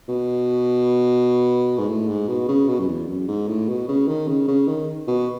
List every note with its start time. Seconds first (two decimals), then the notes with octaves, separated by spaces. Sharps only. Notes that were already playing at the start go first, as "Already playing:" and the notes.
0.09 B2
1.78 G#2
1.88 A2
2.08 G#2
2.28 B2
2.48 C#3
2.68 B2
2.79 F#2
2.88 E2
3.08 F#2
3.28 G#2
3.48 A2
3.68 B2
3.88 C#3
4.08 D#3
4.28 C#3
4.48 C#3
4.68 D#3
5.07 B2